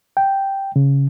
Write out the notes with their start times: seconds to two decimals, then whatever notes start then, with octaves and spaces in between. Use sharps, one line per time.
0.17 G5
0.76 C#3